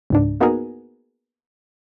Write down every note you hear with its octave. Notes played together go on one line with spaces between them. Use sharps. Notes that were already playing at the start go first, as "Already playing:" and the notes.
C#2 G#2 D4
A#3 B3 D#4 F#4 G#4 A#4